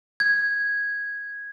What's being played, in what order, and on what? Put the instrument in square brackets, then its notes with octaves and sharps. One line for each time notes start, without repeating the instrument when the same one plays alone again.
[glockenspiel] G#6